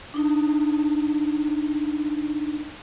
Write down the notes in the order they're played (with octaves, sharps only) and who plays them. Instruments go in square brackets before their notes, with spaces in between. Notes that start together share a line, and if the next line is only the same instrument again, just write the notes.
[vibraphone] D4 D#4